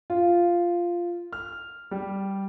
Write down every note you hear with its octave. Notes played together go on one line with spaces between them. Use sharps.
F4
F6
G3